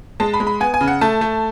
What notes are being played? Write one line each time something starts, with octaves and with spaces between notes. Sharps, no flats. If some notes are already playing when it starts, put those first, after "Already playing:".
G#3 A5
B5
G#3
B5
B3 G#5
G#5
C#3
F#5
A3 A5
A3